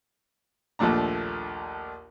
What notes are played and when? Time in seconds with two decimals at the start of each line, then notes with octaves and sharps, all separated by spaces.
0.79 A#1 D#2 F3 A3 D4 A#5